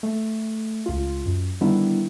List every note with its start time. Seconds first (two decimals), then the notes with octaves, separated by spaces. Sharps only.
0.03 A3
0.86 C#2 F4
1.26 F#2
1.61 D3 D#3 G3 B3 D4 E4